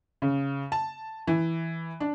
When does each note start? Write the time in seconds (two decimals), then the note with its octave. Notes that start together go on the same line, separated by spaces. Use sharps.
0.22 C#3
0.72 A5
1.27 E3
2.00 D4